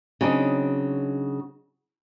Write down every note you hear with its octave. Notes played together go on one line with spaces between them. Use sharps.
C#3 F#3 C4 D4 D#4